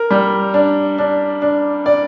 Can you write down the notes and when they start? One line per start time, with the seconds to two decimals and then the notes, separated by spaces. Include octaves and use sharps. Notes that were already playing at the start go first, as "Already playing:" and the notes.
Already playing: A#4
0.11 G3
0.54 D4
0.98 D4
1.42 D4
1.86 D5